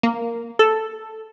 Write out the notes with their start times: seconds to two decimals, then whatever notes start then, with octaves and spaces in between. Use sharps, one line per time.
0.03 A#3
0.59 A4